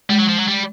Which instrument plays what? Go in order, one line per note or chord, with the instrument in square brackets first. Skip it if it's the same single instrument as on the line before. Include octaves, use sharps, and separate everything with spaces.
[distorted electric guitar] G3 [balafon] G#3
[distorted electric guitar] F#3
F3
F#3
G3